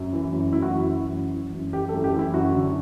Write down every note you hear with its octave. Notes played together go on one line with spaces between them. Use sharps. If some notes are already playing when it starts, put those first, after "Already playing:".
Already playing: F#2
E3
F#2
E3 E4
F#4
F#2 E4
E3
F#2
E3
F#2
E3 G4
A4
F#2
G4
E3 E4
F#2 F#4
D3